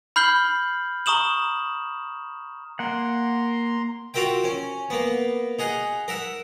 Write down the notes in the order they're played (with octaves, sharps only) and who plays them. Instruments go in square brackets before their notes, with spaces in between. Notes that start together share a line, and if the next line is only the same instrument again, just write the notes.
[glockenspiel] B5 F6 G6 C7 F#7 G7
A#5 C#6 D#6 E7 F#7
[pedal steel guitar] A#3 F#5 [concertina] A#5 C6
[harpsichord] F4 F#4 A#4 E5 G5
C#4
A#3 B3
D#4 G#4 F#5
A#4 E5 F#5